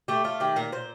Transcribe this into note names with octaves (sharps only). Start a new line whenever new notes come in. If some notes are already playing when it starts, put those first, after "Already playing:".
A3 G4
A3 F4
D#3 G4
A#2 A#4
A#2 C5